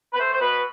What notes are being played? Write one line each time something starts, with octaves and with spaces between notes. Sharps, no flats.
B4
A3 C5
C5
B2 B4